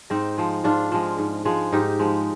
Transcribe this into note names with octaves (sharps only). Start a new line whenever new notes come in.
G#2 C4 D#4
F3 G#3
G#2 D4 F4
F3 G#3
G#2
F3 G#3
G#2 D#4 G4
F3 G#3